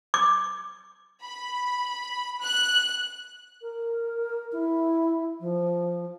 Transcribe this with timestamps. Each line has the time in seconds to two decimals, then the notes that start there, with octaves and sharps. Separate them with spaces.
0.14 D6
1.23 B5
2.42 F#6
3.62 A#4
4.52 E4
5.40 F3